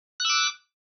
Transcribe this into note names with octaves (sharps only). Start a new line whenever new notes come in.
D6 E6 F#6